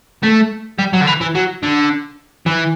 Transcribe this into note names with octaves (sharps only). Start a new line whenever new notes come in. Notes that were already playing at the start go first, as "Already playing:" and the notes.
A3
G3
F#3
D3
E3
E3
F#3
D3
E3